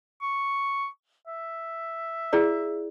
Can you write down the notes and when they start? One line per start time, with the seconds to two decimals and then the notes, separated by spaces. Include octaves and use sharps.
0.22 C#6
1.27 E5
2.33 E4 G#4 D5